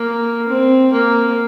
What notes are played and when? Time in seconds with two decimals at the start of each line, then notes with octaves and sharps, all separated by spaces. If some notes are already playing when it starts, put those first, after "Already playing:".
Already playing: A#3
0.49 C4
0.92 A#3